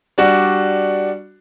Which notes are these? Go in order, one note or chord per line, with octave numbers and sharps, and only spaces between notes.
G3 D4 F#4